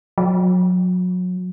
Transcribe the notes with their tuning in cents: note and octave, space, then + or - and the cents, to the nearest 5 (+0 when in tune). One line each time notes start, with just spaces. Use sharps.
F#3 -30